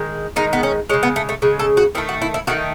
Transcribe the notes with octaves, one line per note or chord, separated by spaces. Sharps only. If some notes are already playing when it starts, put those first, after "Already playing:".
Already playing: D#3 G#3
D#3 G#3 D#4
B3
C#4
C#3 G#3 C#4
B3
A3
A3
C#3 G#3
A4
F#4
D#3 A3 E4
F#4
E4
E4
D#3 A3 F#4